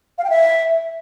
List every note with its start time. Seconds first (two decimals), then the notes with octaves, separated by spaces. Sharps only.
0.18 F5
0.24 G5
0.30 E5